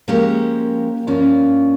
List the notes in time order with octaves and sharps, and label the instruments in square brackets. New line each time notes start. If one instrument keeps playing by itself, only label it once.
[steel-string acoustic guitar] F3 G#3 C#4 G4 A#4 [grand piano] A#3
[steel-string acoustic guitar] G2 F3 A#3 F4 [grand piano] C#4